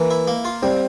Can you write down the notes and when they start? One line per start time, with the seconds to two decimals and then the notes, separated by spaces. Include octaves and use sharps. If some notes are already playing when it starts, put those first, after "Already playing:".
Already playing: E3 A#3
0.11 E4
0.28 A#3
0.45 F4
0.62 G3 C4